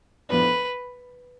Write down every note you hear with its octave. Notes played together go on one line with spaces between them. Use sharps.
A2 F3 B3 D4 B4